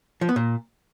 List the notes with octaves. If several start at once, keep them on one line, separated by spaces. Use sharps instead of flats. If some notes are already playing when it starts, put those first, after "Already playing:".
F3
B3
A#2